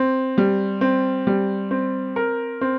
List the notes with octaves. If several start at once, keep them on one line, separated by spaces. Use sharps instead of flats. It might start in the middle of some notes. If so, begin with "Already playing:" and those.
Already playing: C4
G3
C4
G3
C4
A#4
C4